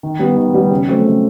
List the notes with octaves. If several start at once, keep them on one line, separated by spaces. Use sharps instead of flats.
D#3
G3 B3
D#3
G3 B3
C#3
F#3 A3 C4
C#3